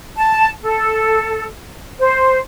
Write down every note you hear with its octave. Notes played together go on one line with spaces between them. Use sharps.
A5
A4
C5